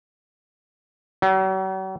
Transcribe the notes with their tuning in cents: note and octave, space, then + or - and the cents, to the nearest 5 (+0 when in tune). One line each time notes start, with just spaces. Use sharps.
F#3 +45